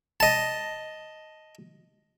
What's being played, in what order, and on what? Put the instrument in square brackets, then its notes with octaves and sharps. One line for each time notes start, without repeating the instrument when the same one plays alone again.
[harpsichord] D#5 A5